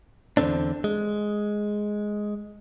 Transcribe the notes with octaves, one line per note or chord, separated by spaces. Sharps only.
E2 G#2 D3 C4 D4
G#3